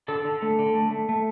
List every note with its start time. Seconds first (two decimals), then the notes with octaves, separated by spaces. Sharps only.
0.08 D3 A4
0.25 D3
0.42 A3
0.59 D3
0.75 A3
0.91 A3
1.09 A3